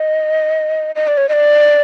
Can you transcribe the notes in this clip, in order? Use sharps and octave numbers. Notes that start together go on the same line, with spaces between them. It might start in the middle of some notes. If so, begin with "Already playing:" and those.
Already playing: D#5
D#5
D5
C#5
D#5
D5